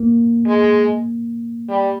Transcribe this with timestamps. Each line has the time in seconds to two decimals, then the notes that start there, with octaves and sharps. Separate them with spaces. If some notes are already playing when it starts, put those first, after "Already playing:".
Already playing: A#3
0.47 G#3
1.69 G3